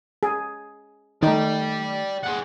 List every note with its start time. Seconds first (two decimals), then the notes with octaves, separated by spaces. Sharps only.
0.23 G#4
1.23 D#3 A3 D#4 D5 G5
2.23 G#4 F#5